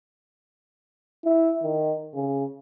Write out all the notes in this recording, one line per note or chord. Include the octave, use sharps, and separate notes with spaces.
E4
D#3
C#3